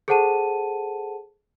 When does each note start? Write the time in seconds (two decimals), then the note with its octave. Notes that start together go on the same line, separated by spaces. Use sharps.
0.08 G#4 A4 C5 F#5 A5 D#7